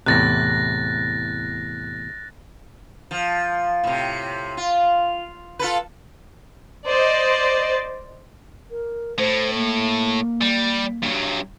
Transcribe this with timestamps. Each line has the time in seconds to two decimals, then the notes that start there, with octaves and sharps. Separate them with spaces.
0.06 E2 A2 C3 F#6 A6 A#6
3.11 F3
3.83 A2 C3
4.57 F4
5.59 F4 A4 B4
6.86 C5 D5 D#5
8.70 A#4
9.18 A2 C5
9.53 A#3
10.42 G3
11.03 G2 F#3